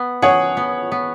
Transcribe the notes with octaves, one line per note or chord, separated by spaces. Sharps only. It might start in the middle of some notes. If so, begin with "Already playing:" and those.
Already playing: B3
G#4 C#5 F#5
B3
B3